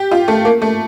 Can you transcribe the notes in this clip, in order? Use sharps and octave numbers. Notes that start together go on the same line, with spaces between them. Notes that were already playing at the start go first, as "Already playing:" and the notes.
Already playing: G4
F4
A3
A#3
A3